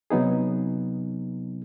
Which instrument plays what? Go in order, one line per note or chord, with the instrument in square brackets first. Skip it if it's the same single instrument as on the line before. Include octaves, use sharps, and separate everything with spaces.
[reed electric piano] C3 F#3 B3 D#4 G#4